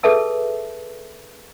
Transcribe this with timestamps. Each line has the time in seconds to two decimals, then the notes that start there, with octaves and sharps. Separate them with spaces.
0.03 G#4 A4 B4 E5 A5 E6